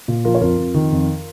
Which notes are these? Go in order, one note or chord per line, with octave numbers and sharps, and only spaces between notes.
A#2
F3 F4 A#4
C#5
F2 F4 A#4
F2
D#3
F2